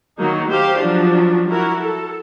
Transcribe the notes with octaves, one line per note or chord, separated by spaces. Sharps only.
D#3 F#3 A#3 D#4
G4 C5 F5
F3 F#3 D4
E4 F#4 A#4
A4